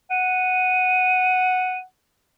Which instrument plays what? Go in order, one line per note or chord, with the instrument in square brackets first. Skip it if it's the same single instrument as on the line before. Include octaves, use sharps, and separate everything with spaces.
[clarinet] F#5 [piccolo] D#7